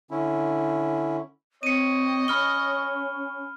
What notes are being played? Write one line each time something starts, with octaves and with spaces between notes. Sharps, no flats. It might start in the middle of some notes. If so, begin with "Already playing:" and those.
D3 C#4 E4
C4 C#5 D#5 C#7 D#7
C#4 B5 F6 G7